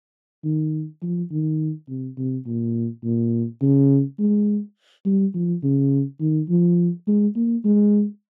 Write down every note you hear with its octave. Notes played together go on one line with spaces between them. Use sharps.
D#3
F3
D#3
C3
C3
A#2
A#2
C#3
G#3
G3
F3
C#3
D#3
F3
G#3
A#3
G#3